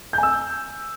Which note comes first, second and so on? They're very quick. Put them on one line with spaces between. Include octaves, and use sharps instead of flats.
G6 G#5 E6